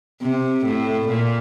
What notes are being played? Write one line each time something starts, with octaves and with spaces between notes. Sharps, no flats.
C3
A2
A#2